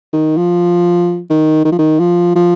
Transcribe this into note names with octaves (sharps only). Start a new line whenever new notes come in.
D#3
F3
D#3
D#3
F3
D#3
F3
F3